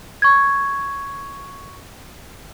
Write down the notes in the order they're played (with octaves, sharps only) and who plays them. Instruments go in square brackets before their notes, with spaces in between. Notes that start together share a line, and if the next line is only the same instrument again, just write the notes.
[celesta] C#6 G#6